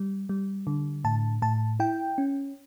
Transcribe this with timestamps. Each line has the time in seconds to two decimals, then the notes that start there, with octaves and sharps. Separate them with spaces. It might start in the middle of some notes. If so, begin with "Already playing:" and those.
Already playing: G3
0.29 G3
0.67 D3
1.04 A2 A5
1.42 A2 A5
1.80 E4 G5
2.18 C#4